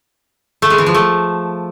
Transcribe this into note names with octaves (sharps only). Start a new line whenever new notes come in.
A3
G#3
E3
F3
A3